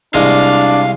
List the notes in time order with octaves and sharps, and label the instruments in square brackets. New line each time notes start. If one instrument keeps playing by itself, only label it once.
[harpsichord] C2 G#3 [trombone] D4 [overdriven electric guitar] F5